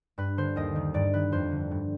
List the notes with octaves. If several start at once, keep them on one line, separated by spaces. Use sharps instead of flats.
G2 B4
D3 C5
D#2 D#5
D#3
G2 D5
D#3 B4
F2 C5
D3
G2